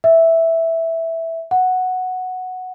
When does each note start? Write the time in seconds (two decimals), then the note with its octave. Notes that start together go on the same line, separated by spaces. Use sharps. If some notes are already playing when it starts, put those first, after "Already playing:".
0.04 E5
1.51 F#5